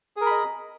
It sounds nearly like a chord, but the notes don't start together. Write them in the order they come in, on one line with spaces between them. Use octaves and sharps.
G#4 A#4 B5 D#5